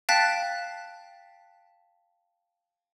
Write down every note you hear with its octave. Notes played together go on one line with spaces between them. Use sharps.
F5 G5 A5 F#6 A6 B6